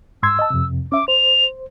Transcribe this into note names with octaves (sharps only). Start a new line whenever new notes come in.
G#2 C6 E6 G#6
D#5 A5
F2 C3
C#4 E5 D6
C5 F7